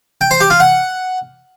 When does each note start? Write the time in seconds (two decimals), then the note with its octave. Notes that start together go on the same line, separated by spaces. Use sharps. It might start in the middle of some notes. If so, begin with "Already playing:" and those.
0.21 G5
0.31 C5
0.41 G4
0.50 F4
0.60 F#5